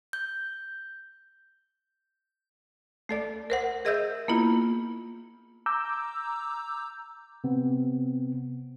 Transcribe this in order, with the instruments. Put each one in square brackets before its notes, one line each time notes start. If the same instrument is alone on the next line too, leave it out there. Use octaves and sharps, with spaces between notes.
[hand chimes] G6
[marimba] A3 A4 D5
A#4 C5 F#5
G#4 A#4 D#5 E5 E6 G6
A#3 B3 E4 F4
[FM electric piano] A#5 D6 E6 G6
[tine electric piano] C3 B3 C4